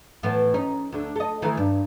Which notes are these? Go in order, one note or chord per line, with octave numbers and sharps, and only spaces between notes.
A2 E3 B3
C#4 D#4
D2 D3
A4 D#5
D#3 E3 A3
G2